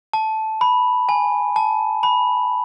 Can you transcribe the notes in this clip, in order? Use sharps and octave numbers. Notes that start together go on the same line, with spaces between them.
A5
B5
G#5
A5
B5